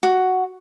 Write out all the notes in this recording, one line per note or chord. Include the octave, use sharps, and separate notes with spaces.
F#4